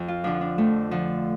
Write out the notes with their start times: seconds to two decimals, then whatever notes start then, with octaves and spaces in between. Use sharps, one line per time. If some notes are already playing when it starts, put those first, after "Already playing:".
Already playing: F2
0.08 F4
0.24 D3 F3 D4
0.41 D4
0.58 F2 A3
0.91 D3 F3